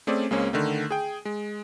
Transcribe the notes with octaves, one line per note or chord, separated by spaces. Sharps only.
A3 C4 C#4 G#4 D5
C#2 G#3 A#3 C4 C#4
D3 D#3 A3
G#4 G5
G#3